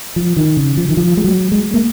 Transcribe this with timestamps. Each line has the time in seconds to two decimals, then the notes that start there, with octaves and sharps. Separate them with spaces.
0.16 F3
0.37 D#3
0.57 C#3
0.77 F3
0.89 D#3
0.97 F3
1.17 G#3
1.24 F#3
1.52 G#3
1.74 A#3